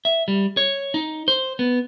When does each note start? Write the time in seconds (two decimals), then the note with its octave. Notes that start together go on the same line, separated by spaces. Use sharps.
0.05 E5
0.28 G3
0.57 C#5
0.94 D#4
1.28 C5
1.59 B3